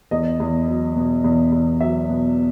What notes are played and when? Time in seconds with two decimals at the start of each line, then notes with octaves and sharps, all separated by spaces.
0.11 E2 D#5
0.40 E2
0.68 F#3
0.96 B2
1.24 E2
1.52 E2
1.81 F#3 E5
2.09 B2